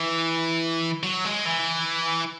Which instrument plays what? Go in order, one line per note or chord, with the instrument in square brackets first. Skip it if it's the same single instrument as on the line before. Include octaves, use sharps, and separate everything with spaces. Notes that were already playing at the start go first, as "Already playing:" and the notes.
Already playing: [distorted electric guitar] E3
F#3
G#3
E3